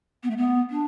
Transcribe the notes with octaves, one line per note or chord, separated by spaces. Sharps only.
B3
A3
B3
D4